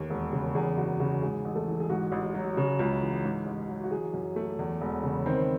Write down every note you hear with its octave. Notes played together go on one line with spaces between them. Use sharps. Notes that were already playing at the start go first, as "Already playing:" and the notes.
Already playing: D#2 A3
E1
C#3
E2 G#4
F#1 F#4
C#3 F#4
G#2 G#4
A1
A3 A4
E3
G#4
G#2 F#4
A1
F#3
C#3
C#2
E3
G#2
A1
F#3
F#4
E3 G#4
F#2
A3
E2
E1
C#3
D#3 C4 C5